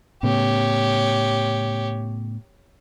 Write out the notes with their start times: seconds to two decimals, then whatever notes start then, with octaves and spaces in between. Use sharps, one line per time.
0.23 A2 C#3 B3 G4 C#5